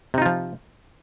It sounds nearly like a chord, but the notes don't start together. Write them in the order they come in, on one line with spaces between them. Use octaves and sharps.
C3 D#4 F4 F3